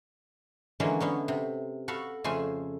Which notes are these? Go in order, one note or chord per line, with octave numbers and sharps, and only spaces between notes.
D3 E3 F#3 G#3 A#3 C#4
D3 B3 C#4
C3
F#4 A4 F5 B5
F2 C#3 A3 F4 C5 G#5